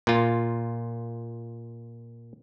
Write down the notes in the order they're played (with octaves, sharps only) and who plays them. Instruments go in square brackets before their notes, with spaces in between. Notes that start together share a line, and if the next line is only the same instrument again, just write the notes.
[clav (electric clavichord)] A#2 F4